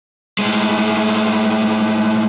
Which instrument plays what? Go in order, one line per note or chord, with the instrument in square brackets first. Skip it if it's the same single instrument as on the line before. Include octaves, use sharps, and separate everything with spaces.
[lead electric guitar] A2 G#3